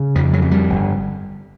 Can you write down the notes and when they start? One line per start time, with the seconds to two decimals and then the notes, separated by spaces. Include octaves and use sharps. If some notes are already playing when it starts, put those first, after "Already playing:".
Already playing: C#3
0.15 F2 F3
0.33 F#3
0.42 F2
0.51 G3
0.70 G1